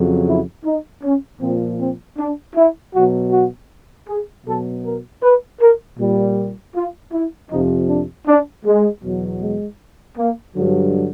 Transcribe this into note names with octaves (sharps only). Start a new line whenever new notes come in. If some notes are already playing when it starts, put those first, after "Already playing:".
Already playing: F2 C#3 F#3
E4
D#4
C#4
A#2 F3 C4
C4
D4
E4
B2 F#3 F#4
F#4
G#4
B2 F#3 A4
A#4
B4
A#4
A#2 G3
F4
E4
F2 C3 F3 D#4
D4
D4
G#3
E2 B2 F#3
G#3
A#3
G2 D3 F#3